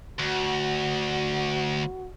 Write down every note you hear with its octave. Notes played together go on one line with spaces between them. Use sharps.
D2 F#4